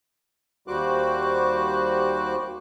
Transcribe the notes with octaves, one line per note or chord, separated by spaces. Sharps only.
D#2 G3 F#4 C5 D6 F#6